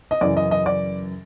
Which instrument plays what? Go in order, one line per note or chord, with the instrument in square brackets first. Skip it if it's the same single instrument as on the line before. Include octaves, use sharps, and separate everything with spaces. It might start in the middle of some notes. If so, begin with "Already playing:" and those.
[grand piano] D#5
F#2 C#3 E3 D5
D#5
D#5
D5